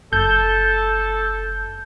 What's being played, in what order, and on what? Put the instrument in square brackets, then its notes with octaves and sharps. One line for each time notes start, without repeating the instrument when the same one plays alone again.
[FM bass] F#1 [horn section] A4 [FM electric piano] G6